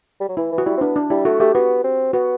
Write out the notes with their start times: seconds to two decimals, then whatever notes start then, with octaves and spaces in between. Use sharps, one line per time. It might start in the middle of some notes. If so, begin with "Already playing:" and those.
0.21 G3
0.29 F#3
0.37 E3 E4
0.52 E3
0.58 F#4
0.66 G3 E4
0.77 C4
0.81 B3 D4
0.96 D4
1.10 G3 E4
1.25 A3 F#4
1.40 A3 G4
1.55 B3 F#4
1.84 C4
2.13 B3 F#4